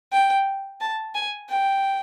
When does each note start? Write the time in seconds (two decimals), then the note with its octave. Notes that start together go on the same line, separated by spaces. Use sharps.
0.12 G5
0.81 A5
1.15 G#5
1.49 G5